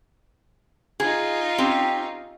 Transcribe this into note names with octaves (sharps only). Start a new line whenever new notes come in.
D#4 F4 G#4
C4 C#4 G4